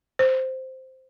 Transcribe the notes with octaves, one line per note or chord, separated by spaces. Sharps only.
C5